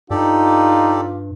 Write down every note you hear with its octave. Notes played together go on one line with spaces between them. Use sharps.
G2 D#4 F4 G4 A4 D5